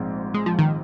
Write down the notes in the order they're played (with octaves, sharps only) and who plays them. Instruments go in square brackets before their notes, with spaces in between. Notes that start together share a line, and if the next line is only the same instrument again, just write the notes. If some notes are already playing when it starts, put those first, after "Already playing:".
Already playing: [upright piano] A#1 G#2 C4
[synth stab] G#3
F3
D#3